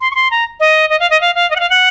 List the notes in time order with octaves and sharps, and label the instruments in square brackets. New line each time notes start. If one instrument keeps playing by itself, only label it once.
[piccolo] C6
C#6
C6
A#5
D#5
D#5
F5
D#5
F5
F5
D#5
F#5
F5
F#5